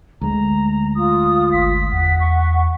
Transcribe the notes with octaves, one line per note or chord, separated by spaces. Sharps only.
D2 G#3 A#5
F4 D#6
G1 B6
E2 F#5
C#6